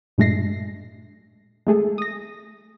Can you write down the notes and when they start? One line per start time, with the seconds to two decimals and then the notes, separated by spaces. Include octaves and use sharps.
0.18 G2 A#2 G#3 A3 A#6 C7
1.67 G#3 A3 G#4 A4
1.98 D#6 A#6